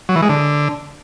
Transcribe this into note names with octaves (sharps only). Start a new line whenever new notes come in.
F#3
E3
G#3
D3